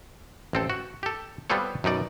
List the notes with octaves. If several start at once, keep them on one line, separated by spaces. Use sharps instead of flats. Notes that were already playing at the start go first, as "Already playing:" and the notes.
A1 C4 A4
F#4
G4 A4
G3 B3 C4 F4 A4 C#5
F#2 B2 D#4 D5